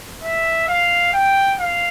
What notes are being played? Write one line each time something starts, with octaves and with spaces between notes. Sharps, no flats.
E5
F5
G5
F5